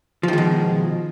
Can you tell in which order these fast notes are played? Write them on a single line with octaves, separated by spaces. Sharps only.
F3 D#3 G#3 B2